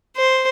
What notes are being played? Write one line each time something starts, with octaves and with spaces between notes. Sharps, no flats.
C5